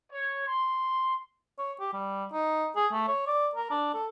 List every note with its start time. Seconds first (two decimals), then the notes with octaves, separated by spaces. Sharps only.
0.11 C#5
0.46 C6
1.59 C#5
1.80 G4
1.93 G3
2.32 D#4
2.76 G#4
2.92 A3
3.08 C#5
3.27 D5
3.55 A#4
3.71 D4
3.94 A4